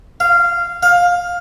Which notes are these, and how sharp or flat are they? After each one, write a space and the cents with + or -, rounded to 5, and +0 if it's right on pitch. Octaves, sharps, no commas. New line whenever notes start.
F5 -15
F5 +15